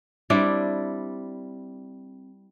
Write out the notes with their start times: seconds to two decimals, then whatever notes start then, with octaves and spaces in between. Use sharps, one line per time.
0.30 G3 C4 D4 E4